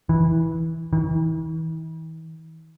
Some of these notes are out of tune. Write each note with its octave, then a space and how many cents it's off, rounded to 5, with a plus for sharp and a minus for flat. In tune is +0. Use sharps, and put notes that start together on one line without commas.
E3 -20
E3 -45